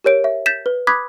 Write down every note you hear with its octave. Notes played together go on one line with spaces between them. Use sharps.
G4 A#4 C#5 D7
E5
G6 A6 B6 E7
B4
B5 D6 D#6 F#6 G#6 B6